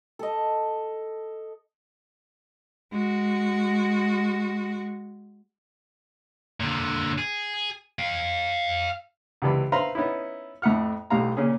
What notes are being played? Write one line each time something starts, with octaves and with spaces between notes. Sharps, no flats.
A4 D#5
G#3 F#4
A#2 D3
G#4
F5 G5
C#2 C3 E3 D5 B5
B4 C5 E5 F5 A#5 C6
B3 C#4 D#4 E4
F2 A2 E5 F#5 F6
B1 A2 G3 F5 A#5
A#2 C#3 C#4 G#4